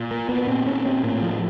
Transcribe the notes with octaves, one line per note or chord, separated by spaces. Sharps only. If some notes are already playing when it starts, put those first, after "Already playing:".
Already playing: A#2
A#3
B3
A#2 C4
C#4
C4
A2 A#3
F3